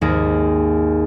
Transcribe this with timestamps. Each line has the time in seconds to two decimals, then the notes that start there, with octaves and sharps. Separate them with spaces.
0.01 G#1 D#2 A#3 G#4